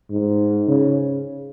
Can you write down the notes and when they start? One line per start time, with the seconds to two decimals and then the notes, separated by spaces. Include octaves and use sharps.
0.11 G#2
0.68 C#3